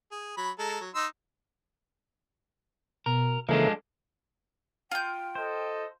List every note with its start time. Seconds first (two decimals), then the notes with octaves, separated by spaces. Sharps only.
0.12 G#4
0.37 F#3 B5
0.59 G#3 A4 A#5
0.81 F#3
0.95 D#4 C6 E6
3.06 B2 A#4
3.49 C#3 E3 F3 G#3 A#3 D4 A4
4.91 F4 G5 G6
5.35 A4 C5 D#5